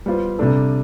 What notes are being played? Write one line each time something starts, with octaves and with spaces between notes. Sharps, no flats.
G3 B3 F4 C5
C3 G3 D4 A4